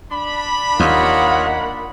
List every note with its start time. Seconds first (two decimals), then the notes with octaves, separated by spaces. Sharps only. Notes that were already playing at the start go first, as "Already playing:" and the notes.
0.11 D4 B5
0.80 D#2 A#3 F4 C#5 D#5 F#5